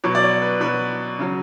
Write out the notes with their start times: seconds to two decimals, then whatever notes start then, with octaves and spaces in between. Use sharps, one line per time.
0.04 B2 F#3 C#5
0.15 D5
0.23 C#5
0.42 B4
0.60 B2 F#3 B4
1.19 C#3 F#3